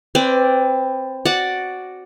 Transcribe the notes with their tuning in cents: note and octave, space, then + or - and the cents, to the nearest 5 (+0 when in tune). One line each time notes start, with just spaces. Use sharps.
C4 +10 B4 +30 D5 +0
F#4 +0 D5 +0 F#5 +0